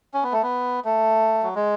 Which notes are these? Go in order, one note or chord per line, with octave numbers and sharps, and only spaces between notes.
C#4
B3
A3
B3
A3
F#3
G#3